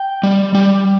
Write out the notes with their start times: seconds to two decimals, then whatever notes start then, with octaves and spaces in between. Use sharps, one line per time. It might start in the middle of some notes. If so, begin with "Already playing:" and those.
Already playing: G5
0.23 G3
0.55 G3